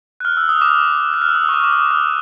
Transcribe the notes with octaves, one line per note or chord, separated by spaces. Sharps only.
F#6
F6
E6
D#6
D6
F#6
F6
E6
D#6
C#6
D6
D6
D#6
F6